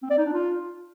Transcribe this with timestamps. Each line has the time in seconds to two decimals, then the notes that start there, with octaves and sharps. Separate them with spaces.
0.03 C4
0.10 D5
0.18 D#4
0.25 D4
0.33 F4